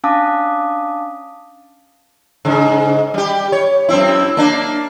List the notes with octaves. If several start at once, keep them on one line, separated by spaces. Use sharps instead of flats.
C#4 D4 F5 A5 D6 D#6
G#2 C#3
G3 G4
C#5
F#2 C4 E4
A#3 D4